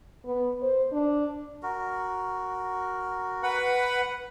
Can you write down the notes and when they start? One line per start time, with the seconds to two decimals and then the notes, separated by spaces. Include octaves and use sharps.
0.25 B3
0.62 C5
0.92 D4
1.63 F#4 A#4
3.43 B4 F#5 B5